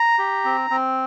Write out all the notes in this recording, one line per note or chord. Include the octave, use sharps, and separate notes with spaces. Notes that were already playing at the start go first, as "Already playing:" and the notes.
Already playing: A#5
G4
C4
C4